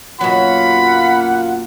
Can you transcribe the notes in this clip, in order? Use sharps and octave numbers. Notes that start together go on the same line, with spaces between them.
F#2 B2 F#3 A#3 F4 F#5 B5